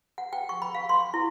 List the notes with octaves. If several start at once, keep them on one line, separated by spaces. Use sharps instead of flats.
F#5
G5
C#6
B5
F5
C6
E4